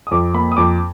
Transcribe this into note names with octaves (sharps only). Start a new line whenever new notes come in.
D#6
F2 D6
A#3 B5
D#6
F2 D6